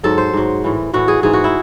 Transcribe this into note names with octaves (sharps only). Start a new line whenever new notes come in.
G#2 F#3 A4
C5
G#2 F#3
A2 E3
A2 E3 F#4
G#4
G#2 E3 G#4
F#4
E4